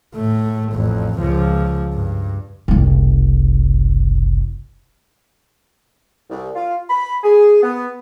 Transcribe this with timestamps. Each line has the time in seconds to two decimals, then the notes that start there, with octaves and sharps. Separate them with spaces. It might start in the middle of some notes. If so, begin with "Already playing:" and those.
0.15 A2 A3
0.73 A1 F2
1.20 C#2 F3
1.93 G2
2.68 F#1 C2
6.30 C2
6.55 F4
6.89 B5
7.23 G#4
7.62 B3